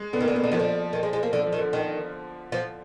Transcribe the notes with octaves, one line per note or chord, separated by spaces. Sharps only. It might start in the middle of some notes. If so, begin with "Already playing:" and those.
Already playing: G#3
D3 B3
D#3
A#3
D3
D#3 B3
D3 A#3
D#3 F3
D3
D#3
G#3
G#3
A#3
D3 F3
F3
D#3
D3
D#3
F3